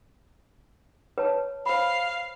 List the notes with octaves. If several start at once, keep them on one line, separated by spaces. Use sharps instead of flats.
B4 C#5 A5
C5 F5 B5